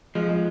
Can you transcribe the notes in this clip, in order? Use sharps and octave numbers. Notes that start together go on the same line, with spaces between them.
F3 G#3
G#3